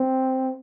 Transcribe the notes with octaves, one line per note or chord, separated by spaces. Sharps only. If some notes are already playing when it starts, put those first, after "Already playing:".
Already playing: C4